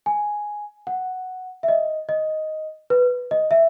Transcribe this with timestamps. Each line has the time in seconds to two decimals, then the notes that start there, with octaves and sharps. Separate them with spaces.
0.06 G#5
0.87 F#5
1.63 E5
1.68 D#5
2.09 D#5
2.90 B4
3.31 D#5
3.51 E5